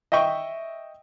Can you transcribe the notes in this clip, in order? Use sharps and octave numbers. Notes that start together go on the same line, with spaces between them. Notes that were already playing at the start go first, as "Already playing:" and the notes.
D#5 E5 G5 C#6